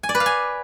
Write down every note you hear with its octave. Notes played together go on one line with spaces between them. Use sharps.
G#5
D5
B4
F5
G#5